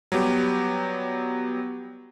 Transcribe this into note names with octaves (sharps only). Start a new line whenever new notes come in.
F#3 G3 B3 G4